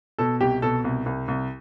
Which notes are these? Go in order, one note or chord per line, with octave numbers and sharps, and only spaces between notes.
B2 A4
C2 G4
B2 A4
C2
C2
C2